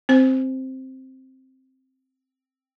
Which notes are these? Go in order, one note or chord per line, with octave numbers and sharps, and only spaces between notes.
C4 C5